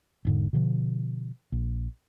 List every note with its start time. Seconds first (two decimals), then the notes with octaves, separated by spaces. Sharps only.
0.25 E1 G#2 D3
0.53 B2 D3 F3
1.52 A#1